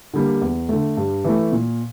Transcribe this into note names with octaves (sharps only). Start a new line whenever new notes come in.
D3 G3 A#3
E2
D3 A3
G2
E3 A3
A#2